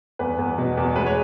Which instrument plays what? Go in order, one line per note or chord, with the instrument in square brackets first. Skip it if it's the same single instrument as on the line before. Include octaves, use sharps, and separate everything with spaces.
[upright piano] E2 B4
E2
B2
E2
G#3 B4
C#5